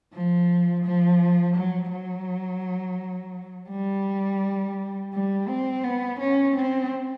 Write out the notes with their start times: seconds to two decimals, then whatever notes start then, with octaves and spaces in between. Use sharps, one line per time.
0.14 F3
0.85 F3
1.56 F#3
1.92 F#3
3.70 G3
5.13 G3
5.48 C4
5.84 B3
6.20 C#4
6.56 C4